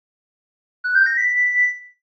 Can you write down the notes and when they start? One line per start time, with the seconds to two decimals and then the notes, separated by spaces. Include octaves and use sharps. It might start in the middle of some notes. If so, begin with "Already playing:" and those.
0.84 F#6
0.95 G6
1.06 A#6
1.18 B6